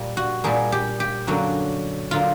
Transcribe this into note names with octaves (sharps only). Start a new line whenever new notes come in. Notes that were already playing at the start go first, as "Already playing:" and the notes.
Already playing: A#2 G3 A#3
F#4
A#2 G3 A#3 G#4
G4
G4
F#2 D3 F#3 A#3 F#4
D3 F#3 A#3 F4